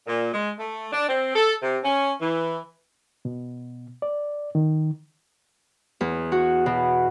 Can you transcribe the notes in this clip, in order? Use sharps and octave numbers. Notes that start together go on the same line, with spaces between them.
A#2
G#3
A3
D4
C4
A4
C3
C#4
E3
B2
D5
D#3
E2
F#4
B2